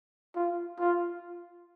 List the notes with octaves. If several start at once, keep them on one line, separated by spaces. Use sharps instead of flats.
F4
F4